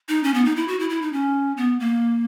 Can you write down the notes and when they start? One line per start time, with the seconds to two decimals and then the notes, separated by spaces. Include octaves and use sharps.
0.09 D#4
0.24 C#4
0.34 B3
0.45 D#4
0.56 E4
0.68 F#4
0.79 E4
0.90 E4
1.02 D#4
1.13 C#4
1.57 B3
1.80 A#3